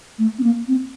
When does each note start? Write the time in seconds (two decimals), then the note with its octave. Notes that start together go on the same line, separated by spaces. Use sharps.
0.19 A3
0.39 C4
0.43 A#3
0.68 C4